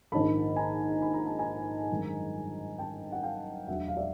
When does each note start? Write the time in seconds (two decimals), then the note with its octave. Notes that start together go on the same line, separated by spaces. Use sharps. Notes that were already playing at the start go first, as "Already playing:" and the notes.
0.12 A#1 G#2 D#3 A5 B5
0.56 G#5 A#5
1.02 B5
1.14 A#5
1.26 A5
1.39 G#5 A#5
1.90 G1 F#2 D#3 G#3
2.78 G5 A5
3.12 F#5
3.23 F5 G5
3.67 E1 D2 D3 F#3 E5 F#5
3.88 F5
3.97 D5 E5